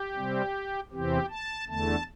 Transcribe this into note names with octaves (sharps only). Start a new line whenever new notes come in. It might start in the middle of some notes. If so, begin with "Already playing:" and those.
Already playing: G4
C3 G3 C4
E2 C3 E3 C4 G4
A5
E2 D3 A3 A5